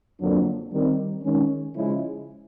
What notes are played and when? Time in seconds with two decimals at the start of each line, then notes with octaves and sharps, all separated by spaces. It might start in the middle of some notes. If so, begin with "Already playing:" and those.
0.19 F2 D3 F#3 A#3 D4
0.71 D#3 G3 C4
1.22 D#3 G#3 C#4
1.74 C#3 F3 G#3 C#4 E4